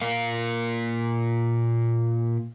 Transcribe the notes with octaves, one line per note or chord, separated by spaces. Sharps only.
A#2 A#3 A#4 F5